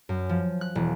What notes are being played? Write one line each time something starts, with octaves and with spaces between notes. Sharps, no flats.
F#2
F3
F#6
E1